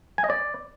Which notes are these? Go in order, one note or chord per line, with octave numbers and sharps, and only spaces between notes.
G#5
D#5
D5